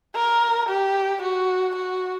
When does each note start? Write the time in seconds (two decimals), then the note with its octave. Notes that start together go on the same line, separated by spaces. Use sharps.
0.15 A#4
0.69 G4
1.22 F#4
1.75 F#4